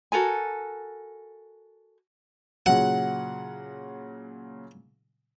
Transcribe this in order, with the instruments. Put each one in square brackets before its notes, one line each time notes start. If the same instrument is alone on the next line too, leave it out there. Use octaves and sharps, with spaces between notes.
[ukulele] F#4 A4 A#4 G#5
[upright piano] A#2 C#3 F#3 [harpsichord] F#5